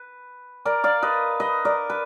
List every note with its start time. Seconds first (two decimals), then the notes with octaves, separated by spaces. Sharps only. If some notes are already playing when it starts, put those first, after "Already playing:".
Already playing: B4
0.65 A#4 D5
0.84 D5 F5
1.02 B4 D#5
1.40 B4 D#5
1.65 A#4 D5
1.90 B4